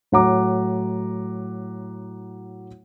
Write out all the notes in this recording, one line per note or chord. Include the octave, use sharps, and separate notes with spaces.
A2 F#3 F#5 A#5 D6